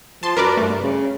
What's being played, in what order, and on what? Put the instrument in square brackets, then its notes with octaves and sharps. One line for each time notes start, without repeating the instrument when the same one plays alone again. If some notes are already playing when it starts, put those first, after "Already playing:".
[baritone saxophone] F3 [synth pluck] A5 C6
[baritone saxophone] F#2 [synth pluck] A#4 B4 D5
[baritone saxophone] G2 [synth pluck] A3
[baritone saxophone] C#3